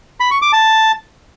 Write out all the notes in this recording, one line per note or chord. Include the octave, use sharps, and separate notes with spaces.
B5
C#6
D6
A5